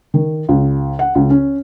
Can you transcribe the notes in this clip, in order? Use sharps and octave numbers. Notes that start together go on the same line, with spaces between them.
D#3
C#2
F#5
C#2
C#4